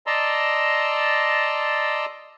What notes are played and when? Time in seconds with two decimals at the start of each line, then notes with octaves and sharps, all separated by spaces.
0.07 D5 D#5 A5 A#5 C6 E6